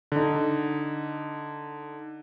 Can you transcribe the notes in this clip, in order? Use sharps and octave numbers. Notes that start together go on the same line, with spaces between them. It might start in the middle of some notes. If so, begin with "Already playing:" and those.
D3 D#4